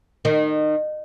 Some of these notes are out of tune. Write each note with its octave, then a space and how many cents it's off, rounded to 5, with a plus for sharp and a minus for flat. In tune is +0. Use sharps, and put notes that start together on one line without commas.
D#3 -25